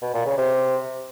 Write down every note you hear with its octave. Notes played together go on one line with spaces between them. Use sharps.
B2
A#2
C#3
C3